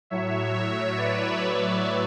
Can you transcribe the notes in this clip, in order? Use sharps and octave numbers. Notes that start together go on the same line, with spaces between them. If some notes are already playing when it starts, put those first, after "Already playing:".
A2 F#3 C#5 E5
C#5 E5
B4 D5